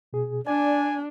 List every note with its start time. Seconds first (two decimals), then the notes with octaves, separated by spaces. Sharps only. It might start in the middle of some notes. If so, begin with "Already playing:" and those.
0.13 B2 G#4
0.47 D4 D5 G#5